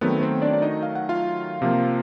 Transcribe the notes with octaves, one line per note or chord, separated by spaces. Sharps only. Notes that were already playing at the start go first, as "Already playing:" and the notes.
D#3 F#3 A3 B3 C4 B4
C4 C5
D4 D5
D5
D#4 D#5
F5
F#5
F4 F5
C3 F3 A#3